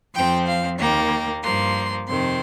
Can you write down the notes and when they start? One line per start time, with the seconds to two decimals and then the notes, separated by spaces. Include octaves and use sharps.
0.15 F2 F3 C4 G5
0.47 F5
0.78 D#2 D#3 A#3 G5
1.43 G2 F3 A#3 C6
2.07 F2 C3 D#3 C4 C6